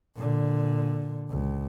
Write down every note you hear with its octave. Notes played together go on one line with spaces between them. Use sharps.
A#2 D3
C#2